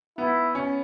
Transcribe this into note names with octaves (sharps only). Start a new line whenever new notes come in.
B3 E4
C#4